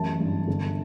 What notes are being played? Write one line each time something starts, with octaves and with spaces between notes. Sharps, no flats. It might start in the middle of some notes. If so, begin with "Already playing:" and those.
Already playing: A1 F#2 A5
G2
G1